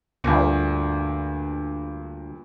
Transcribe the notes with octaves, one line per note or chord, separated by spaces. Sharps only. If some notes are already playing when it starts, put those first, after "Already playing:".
D2 G2 A#2